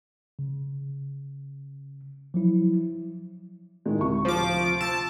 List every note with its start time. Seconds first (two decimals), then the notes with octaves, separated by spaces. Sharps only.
0.39 C#3
2.34 F3 F#3 E4
3.86 A2 D#3 G#3
3.98 D2 C3 C#6
4.25 F3 D6
4.81 A5 E6